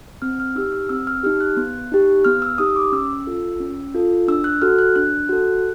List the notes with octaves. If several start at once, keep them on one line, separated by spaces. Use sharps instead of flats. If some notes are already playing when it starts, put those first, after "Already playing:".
C4 F6
F6
D#4 G4 E6
F6
C4 E6
F6
D#4 G4 F6
F#6
B3
D#4 G4
B3 F6
E6
D#4 G4 D#6
D6
C#4 E6
F4 A4
C#4
F4 A4
D4 E6
F#6
F#4 A4 F6
F#6
D4 F#6
F#4 A4